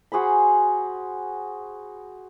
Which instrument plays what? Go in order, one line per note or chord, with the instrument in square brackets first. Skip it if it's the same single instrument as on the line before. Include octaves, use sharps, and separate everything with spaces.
[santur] F#4 G#4 C5 B5